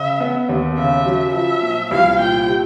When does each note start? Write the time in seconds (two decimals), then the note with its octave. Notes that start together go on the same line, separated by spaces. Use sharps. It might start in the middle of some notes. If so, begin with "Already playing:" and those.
Already playing: C#3 E5
0.20 B3
0.49 D#2
0.77 C#3 E5
1.06 F#3
1.34 F3 E5
1.63 A#2
1.91 C2 F5
2.19 A#2 G5
2.47 C3